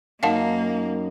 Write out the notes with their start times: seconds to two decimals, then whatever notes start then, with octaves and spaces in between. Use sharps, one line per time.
0.23 F#2 A#3 D#4 F5 F#5 A5